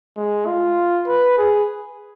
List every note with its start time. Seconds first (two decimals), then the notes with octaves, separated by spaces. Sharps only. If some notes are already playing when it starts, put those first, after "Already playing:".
0.16 G#3
0.47 F4
1.07 B4
1.38 G#4